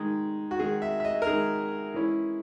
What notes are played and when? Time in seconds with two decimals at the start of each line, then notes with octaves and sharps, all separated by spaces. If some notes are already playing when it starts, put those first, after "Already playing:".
Already playing: D#3 G#3 D#4
0.51 F#4
0.59 D#3 G#3 D#4 G#4
0.82 E5
1.00 E5
1.05 D#5
1.22 A#4
1.27 D#3 G#3 D#4 G#4
1.94 E3 G#3 C#4 E4